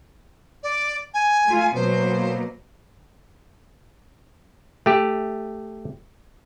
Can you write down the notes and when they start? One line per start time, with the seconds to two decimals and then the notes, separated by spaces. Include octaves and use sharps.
0.63 D5
1.14 G#5
1.44 A3 F4
1.75 B2 F#3 A#3 C5
4.86 A3 G4